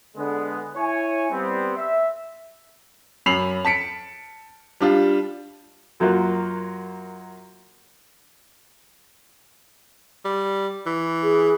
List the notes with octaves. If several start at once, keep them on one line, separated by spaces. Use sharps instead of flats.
D3 G#3 B3
E4 C#5 G#5
G3 B3 C4
E5
F#2 B5 C7 F7 F#7
A5 B6 C#7 D7
G3 D4 F4
F#2 F#3 A#3 F4 F#4
G3
E3
G#4